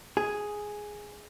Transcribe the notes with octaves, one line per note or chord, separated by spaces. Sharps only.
G#4